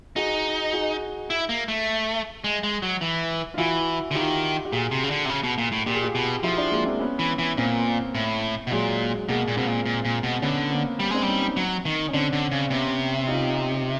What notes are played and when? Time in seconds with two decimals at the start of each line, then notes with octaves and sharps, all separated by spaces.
0.16 D#4 F#4 G#4
0.73 F#4 G#4
1.30 E4
1.49 A#3
1.68 A3
2.44 G#3
2.63 G#3
2.82 F#3
3.01 E3
3.54 F4
3.58 E3 E4 F#4
4.11 D3
4.15 D#3 F4 G4
4.65 G4
4.72 A#2 F#4 G#4
4.91 C3
5.04 C#3
5.11 D3
5.25 C3
5.29 C#3
5.44 B2
5.58 A#2
5.72 A2
5.86 A#2 G4
5.95 G#4
6.04 F4 G4
6.15 B2
6.43 F3 E4 F#4
6.57 D4 E4
6.71 G#3 A#3
6.86 A#3 C4
7.00 B3 C#4
7.19 E3
7.38 E3
7.57 A#2 A#3 C4
8.15 A2
8.67 B2
8.71 A#2 F#3 G#3
9.29 B2 G#3 A#3
9.48 A#2
9.56 B2 A#3 C4
9.67 A#2
9.86 A#2
10.05 A#2
10.23 B2
10.42 D3 B3 C#4
10.70 A#3 C4
11.00 G3
11.11 G#3 C4 D4
11.22 G3
11.27 C#4 D#4
11.42 C#4 D#4
11.56 F#3
11.85 D#3
12.09 C#4
12.13 D3 C4 D4
12.33 D3
12.52 C#3
12.70 C3 B3 C#4
13.27 D#4 F4